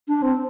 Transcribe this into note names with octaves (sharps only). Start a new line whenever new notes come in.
D4
C4